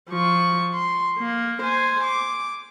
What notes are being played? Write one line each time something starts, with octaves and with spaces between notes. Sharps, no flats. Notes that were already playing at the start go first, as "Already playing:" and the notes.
F3 C#6
C6
A#3
C5 G#5
D6